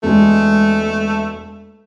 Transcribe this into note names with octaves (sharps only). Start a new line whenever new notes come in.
E1 G#3 A3